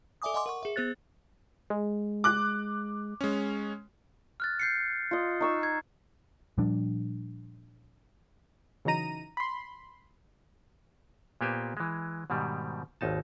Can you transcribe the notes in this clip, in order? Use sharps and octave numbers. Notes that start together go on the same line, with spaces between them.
A4 D5 E5 G#5 D6 D#6
D#5 F#5 G#5 C6 D6
A#4 F#5 C#6
G#4 E5
B3 G#4 C5 F#6 A6
G#3
D6 F#6
G#3 C#4
F6 F#6 A6
G6 C7 C#7
F4 D#5
D#4 C#6 E6
G#6
A#2 F3 G3 D4
C#3 E3 F#3 D#4 A#5 D#7
B5 C6
A#2 A#3 B3 G4 C5 G#5
E3 G#3
G#2 B2 D#3 G3
G#1 D#2 D#4 A5